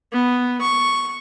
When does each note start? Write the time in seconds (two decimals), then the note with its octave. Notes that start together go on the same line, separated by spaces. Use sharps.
0.13 B3
0.61 C#6